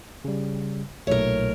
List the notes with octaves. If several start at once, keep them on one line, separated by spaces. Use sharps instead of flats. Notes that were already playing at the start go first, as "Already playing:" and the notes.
C#3 G3
B1 A#2 A3 A#4 C#5